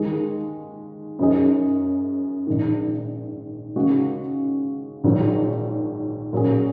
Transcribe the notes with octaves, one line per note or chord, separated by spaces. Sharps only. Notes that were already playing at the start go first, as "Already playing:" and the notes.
Already playing: D#2 D#3 G#3
F#2 F#3 D#4 G#4
A#1 G#2 D#3
D#2 C#3 G#3 F#4
A#1 G#2 D#3 F#3
A#2 F#3 C#4 G#4